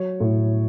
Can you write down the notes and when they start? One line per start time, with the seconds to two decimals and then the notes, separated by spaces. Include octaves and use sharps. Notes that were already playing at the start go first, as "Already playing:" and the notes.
Already playing: F#3 C#5
0.20 A2